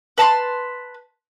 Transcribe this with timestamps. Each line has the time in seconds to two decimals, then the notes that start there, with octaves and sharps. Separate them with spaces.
0.18 B4 A5 A#5 C6